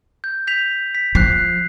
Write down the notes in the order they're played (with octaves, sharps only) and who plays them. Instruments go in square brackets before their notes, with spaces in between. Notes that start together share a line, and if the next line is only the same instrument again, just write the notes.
[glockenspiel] G6
G6 B6 F7
B6
[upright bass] F3 [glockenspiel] F#6 C7